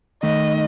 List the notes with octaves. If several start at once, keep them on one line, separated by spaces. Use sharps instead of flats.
D#3 A3 D#4 D#5